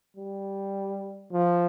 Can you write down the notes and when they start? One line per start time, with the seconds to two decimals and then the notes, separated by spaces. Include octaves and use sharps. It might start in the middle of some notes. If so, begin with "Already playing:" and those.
0.17 G3
1.32 F3